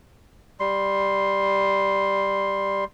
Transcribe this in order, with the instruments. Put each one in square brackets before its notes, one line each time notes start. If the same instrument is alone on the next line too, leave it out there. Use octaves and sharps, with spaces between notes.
[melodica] G3 C6